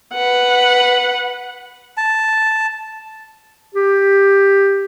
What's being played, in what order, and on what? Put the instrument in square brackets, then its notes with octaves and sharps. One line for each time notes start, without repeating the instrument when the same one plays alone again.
[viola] B4 F#5
[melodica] A5
[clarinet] G4